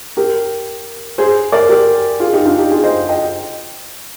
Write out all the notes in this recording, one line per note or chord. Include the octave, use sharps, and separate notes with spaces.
G4 A#4
G#4 C5
A#4 D5
G4 A#4
F4 G#4
D#4 G4
D4 F4
D#4 G4
F4 G#4
C5 D#5
D#5 G5